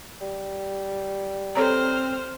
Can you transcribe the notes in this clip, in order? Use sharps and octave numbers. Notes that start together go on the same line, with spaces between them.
G3
C4 A4 C5 C#5 A#5 F6